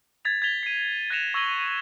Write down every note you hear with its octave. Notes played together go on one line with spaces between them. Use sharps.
G#6 A6 B6 F7
G#6 A6 B6 F7 G7
C7 D#7
F#6 A6 A#6 C#7 E7 F7
C#6 E6 G#6 A#6 F#7 G7